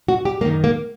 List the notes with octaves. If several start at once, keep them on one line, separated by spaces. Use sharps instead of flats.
F#4
G4
F#2 D#3 A#3
A#3